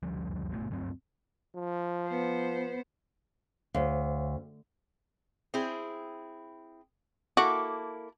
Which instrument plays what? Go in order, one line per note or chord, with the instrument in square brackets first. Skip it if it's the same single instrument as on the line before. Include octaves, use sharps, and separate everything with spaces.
[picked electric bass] F#1 D2 F3 G3
G#1 B2 A3
D2 G2 F#3 C4
[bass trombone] F3
[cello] B3 C5
[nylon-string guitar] D2 [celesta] C5 C#5 F5
[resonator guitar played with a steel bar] C4 E4 G#4
[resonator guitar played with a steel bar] A#3 E4 A4 [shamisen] F#4 [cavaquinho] D6